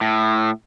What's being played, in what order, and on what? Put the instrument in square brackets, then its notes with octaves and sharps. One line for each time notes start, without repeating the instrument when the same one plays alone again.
[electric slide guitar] A2